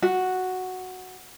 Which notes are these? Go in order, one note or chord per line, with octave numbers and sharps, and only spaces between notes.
F#4